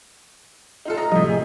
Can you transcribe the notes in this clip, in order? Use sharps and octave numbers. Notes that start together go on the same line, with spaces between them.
D#4 F4 A4
D#5 A#5
A2 C3 F3 G3 D#5
G#4